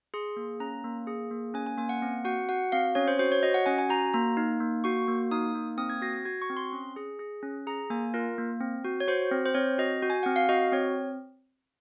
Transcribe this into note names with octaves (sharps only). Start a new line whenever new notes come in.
G#4 C6
A#3
C#4 A#5
A#3
G#4
A#3
C#4 G#5
G#5
A#3 G#5
F#5
C4
F#4 F#5
F#4 F#5
C4 F5
C#4 C#5
C5
F#4 C5
C#5
F#4 D#5
F#5
C#4 G#5
G#5
F#4 A#5
A#3 A#5
D#4
A#3
F#4 C#6
A#3
D#4 D#6
A#3
C4 D#6
G#6
F#4 A#6
A#6
F#4 G#6
C#6
C4
C6
C#4
G#4
G#4
C#4
G#4 A#5
A#3 G#5
F4 A#4
A#3
C4
F#4
C#5
F#4 C5
C4
C5
C4 C#5
F#4 D#5
F#4
G#5
C4 F#5
F5
F#4 D#5
C4 C#5